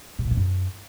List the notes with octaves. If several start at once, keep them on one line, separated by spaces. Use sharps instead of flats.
C3
A#2
E3
F#2